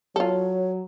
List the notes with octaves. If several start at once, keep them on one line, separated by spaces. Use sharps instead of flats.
F#3 F4 A4 C#5